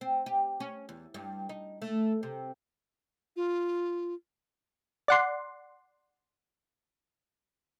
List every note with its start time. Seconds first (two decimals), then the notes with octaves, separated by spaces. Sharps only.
0.01 C4
0.26 G4
0.60 C#4
0.89 E2
1.14 G2
1.49 D#4
1.82 A3
2.23 C3
3.36 F4
5.08 D5 F#5 C6